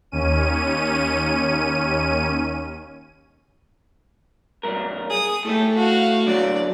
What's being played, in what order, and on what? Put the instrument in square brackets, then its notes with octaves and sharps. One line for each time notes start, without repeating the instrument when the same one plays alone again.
[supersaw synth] D#2 C#4 D#7
[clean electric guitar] B1 G2 A#4
[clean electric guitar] G#4 [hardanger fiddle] D#6
[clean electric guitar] A2 A3 [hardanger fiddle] G4 A4
[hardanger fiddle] F#4 F5
[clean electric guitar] F#2 D3 F#3 [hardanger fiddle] D5